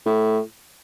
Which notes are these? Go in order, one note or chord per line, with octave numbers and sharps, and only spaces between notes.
A2